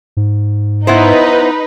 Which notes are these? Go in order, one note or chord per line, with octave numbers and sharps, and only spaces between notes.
G#2
B3 D#4 E4 B4 C5